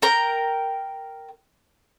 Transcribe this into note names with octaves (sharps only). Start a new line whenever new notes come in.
A#4 G5 A#5